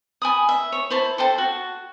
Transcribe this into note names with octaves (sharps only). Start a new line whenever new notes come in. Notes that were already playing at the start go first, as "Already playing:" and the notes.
G#5 B5 D#6
E5
C#5
E4 C5 A5
A4 C5 G5 A5
F#4